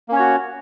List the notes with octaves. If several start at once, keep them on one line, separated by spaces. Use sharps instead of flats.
A#3 C#4 F#4 C#5